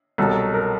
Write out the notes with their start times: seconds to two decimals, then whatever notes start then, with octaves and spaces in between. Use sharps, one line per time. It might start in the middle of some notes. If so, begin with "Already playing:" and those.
0.18 C2 B2 F#3 A4
0.54 A#4